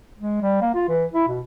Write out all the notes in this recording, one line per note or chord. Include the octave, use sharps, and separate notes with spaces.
G#3
G3
A#3
F4
E3
E4
B2